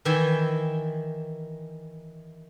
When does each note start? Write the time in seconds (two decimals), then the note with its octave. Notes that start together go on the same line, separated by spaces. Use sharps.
0.05 D#3 E3 E5 G5 G#5